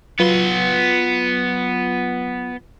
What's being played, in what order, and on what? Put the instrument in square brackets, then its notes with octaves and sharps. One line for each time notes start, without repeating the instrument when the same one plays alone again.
[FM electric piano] F#3 F4 B4 [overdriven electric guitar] B3 C6